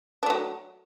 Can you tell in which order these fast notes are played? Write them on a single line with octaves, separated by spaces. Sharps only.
D4 A3 F#3